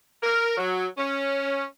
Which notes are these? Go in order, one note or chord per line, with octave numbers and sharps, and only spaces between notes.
A#4
F#3
C#4